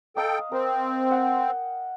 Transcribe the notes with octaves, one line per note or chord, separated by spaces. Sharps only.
A4 D#5 F5 G5 A#5
C4 A#4
F#5 G5